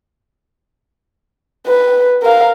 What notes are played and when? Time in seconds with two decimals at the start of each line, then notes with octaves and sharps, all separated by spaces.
1.66 B4
2.23 A#4 F5